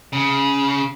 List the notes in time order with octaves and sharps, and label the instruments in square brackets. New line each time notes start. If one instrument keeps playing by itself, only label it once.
[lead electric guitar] C#3